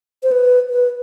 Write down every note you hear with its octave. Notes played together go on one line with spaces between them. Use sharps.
C5
B4
B4